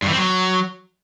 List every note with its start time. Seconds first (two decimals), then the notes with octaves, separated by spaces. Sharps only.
0.02 G2
0.07 E3
0.13 C4
0.18 F#3